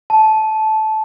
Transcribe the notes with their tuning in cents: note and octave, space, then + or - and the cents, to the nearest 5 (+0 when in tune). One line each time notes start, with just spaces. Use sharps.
A5 -15